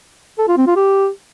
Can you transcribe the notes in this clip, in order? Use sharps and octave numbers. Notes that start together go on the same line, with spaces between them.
A4
F4
C4
F4
G4